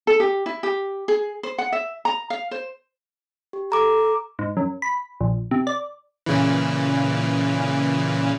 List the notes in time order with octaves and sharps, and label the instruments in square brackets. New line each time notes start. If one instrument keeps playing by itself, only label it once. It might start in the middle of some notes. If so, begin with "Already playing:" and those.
[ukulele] A4
G4
E4
G4
G#4
C5
F#5
E5
A#5
F5
C5
[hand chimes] G4
[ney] A4 [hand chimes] A#5 D6
[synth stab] G#2
F#2
B5
A#1
C3
D5
[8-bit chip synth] A#2 C#3 E3